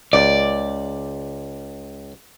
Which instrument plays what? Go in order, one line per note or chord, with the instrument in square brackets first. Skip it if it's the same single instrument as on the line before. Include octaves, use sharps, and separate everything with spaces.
[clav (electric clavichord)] C#2 [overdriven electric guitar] D5